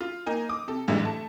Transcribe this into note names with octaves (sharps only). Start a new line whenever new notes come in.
F4
A#3 D#4 G#5
D6 D#6
C3 A4
A1 G#2 D3 E3 G3
A3 A5